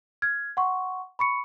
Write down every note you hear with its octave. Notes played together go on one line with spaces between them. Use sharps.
F6 G#6
F#5 C6 C#6
B5 C#6 C#7